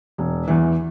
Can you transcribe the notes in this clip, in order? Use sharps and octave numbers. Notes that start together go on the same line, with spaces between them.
E1
E2 E3